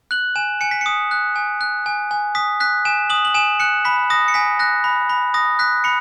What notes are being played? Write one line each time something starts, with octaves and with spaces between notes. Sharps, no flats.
F#6 F#7
G#5 E7
G#5 C#7
B6
D#6 C#7
F#6
G#5
F#6
G#5
G#5
D#6 B6
F#6 B6
G#5 E7
D#6 F#7
F#7
G#5 E7
F#6 C#7
B5 B6
D#6 A#6
C#7
G#5 B6
F#6 A#6
B5
B5
D#6 A#6
F#6 B6
B5 C#7